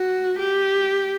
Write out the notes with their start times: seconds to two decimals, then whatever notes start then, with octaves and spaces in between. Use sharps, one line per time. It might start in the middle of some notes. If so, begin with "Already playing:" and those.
Already playing: F#4
0.39 G4